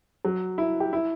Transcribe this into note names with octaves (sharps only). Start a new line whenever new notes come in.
F#3
E4
G4
E4